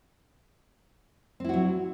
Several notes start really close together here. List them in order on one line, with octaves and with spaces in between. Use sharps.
C4 E4 F#4 F#3